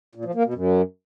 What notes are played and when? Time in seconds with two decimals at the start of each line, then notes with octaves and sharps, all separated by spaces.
0.15 A#2
0.25 F3
0.35 A#3
0.44 B2
0.54 F#2